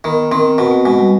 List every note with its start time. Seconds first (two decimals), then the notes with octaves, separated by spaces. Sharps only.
0.04 D#3 B3
0.31 D#3 C4
0.58 B2 C4
0.71 B3
0.85 B2 G#3
0.99 G3